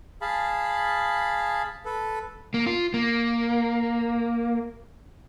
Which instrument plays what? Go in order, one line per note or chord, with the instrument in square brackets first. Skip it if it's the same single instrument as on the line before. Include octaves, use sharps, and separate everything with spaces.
[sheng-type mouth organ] G#4 F5 A5 B5
A4 B4
[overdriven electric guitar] A#3
F4
A#3